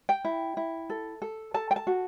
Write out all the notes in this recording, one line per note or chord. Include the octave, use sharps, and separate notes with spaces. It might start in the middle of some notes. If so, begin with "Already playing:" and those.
G5
E4
E4
A4
A4
A4 A5
G5
A5
F#4